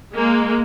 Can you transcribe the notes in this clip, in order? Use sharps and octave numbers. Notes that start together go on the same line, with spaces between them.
G#3 A#3